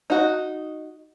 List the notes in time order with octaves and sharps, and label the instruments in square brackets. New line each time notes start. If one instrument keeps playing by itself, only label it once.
[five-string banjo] D#4 F#4